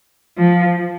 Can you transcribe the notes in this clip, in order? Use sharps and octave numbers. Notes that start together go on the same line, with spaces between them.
F3